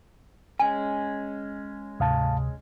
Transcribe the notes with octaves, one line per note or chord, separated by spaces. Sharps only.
G#3 C#4 G#5
D2 G#2 C3 F5 A5 D#6